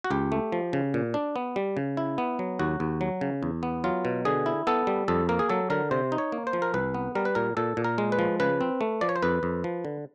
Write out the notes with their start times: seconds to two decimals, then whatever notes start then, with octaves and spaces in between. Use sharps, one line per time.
0.04 F#4
0.11 C#2 G4
0.32 A3
0.52 F3
0.73 C#3
0.94 A#2
1.14 D4
1.36 B3
1.56 G3
1.77 C#3
1.97 E4
2.18 B3
2.39 F#3
2.59 D#2 F#4
2.80 D#2
3.01 F#3
3.21 C#3
3.43 E2
3.63 B3
3.84 F#3 F4
4.05 B2
4.25 D3 G#4
4.46 E4
4.67 B3 A4
4.87 G3
5.08 F2 A4
5.29 A#3 A#4
5.39 G#4
5.49 F#3 A4
5.70 D3 A#4
5.91 C3 C5
6.12 D#4
6.18 C#5
6.32 A#3
6.47 C5
6.53 F3
6.62 A#4
6.74 C2 B4
6.94 B3
7.15 G3 A#4
7.25 B4
7.35 A#2 A#4
7.57 A#2 A4
7.77 A#2
7.84 A#4
7.98 G#3
8.12 B4
8.19 F3
8.40 C#3 B4
8.61 C4
8.81 A3
9.01 F3 D5
9.09 C#5
9.16 C5
9.22 F2 B4
9.43 F2
9.64 F3
9.85 D3